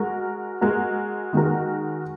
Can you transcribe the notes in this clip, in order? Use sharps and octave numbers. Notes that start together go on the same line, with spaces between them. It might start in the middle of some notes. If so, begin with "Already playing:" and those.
Already playing: G#3 F#4 A#4
G#3 F#4 A#4
D#3 G#3 F#4 A#4